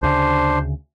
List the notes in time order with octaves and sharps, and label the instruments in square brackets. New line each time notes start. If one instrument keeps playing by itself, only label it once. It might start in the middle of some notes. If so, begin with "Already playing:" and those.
[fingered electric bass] D2 C#3 [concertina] D4 C5